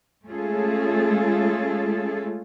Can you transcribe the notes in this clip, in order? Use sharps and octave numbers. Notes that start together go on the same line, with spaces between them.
G#3 A3 C#4 F4 G#4 A4